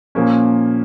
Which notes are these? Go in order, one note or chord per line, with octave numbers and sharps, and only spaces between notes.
A#2 F3 A#3 C#4